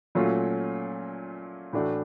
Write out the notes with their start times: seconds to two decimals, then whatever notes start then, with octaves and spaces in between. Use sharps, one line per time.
0.15 A#2 F#3 A3 C#4 F4
1.73 A2 E3 A3 D4 F#4